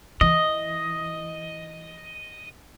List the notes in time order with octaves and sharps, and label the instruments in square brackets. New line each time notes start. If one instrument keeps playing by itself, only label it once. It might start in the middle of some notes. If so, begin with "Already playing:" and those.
[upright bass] E3 [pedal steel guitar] D#5